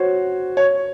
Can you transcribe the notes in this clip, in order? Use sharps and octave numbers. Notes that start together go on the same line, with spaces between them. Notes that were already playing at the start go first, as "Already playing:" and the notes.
Already playing: F#4 C5 C#5
C#5